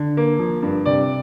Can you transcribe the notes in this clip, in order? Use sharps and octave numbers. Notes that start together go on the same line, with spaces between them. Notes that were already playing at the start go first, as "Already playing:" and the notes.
Already playing: D3
A#3
F3
G2
C3 D5